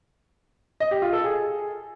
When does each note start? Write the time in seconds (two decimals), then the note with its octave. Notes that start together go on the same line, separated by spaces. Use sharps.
0.80 D#5
0.91 G4
1.02 F4
1.13 A4
1.24 G#4